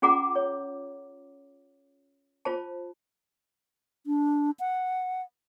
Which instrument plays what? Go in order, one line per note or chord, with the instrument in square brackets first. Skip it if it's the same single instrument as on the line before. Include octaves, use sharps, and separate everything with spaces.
[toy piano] C#4 F4 G#4 F#5 A#5 D6
C#5
F4 C5 A5
[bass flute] D4
F#5